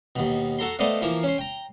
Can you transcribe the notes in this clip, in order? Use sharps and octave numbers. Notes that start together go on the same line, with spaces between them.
D#2 B2
F#4 A4 A#5 C6
A3 B3 C5 D5 D#5 F5
E3 F3 A#3
C#4 C5
G5 A#5